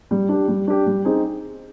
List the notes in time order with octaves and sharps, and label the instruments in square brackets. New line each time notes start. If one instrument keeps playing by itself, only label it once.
[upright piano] G3
D4 G4
G3
D4 G4
G3
C4 D#4 G#4